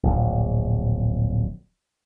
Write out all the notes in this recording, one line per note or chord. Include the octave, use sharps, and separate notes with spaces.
D1 A#1